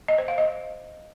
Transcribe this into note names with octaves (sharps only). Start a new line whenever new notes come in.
D#5
C5
F5
D#5